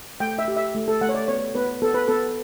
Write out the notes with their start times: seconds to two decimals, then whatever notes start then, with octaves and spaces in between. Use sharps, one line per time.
0.20 A3 G5
0.39 E5
0.48 G4
0.56 E5
0.75 A3
0.88 A4
1.01 A3 F#5
1.09 C#5
1.15 D5
1.28 B3 C#5
1.55 B3 B4
1.82 B3 A4
1.94 B4
2.08 B3 A4